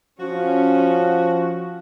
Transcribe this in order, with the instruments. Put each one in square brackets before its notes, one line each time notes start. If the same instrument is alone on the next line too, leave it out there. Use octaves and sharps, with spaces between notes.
[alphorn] F3 [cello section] C#4 [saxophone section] F#4